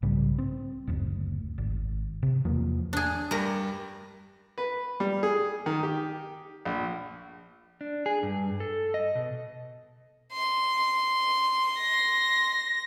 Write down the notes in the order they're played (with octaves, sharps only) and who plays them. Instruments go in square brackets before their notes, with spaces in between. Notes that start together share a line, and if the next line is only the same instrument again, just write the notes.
[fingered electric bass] B1 G#2 C#3 G3
C4
F#1 D2
G#1
C3
E2 F3 A#3
[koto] D4 G#4
[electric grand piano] G2 G3 [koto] A#4 A#5
[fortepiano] B4
G3
G#4
D#3
G4
A#1
[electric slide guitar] D4
G#4
G2
A4
D#5
B2
[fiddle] C6
[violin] A#6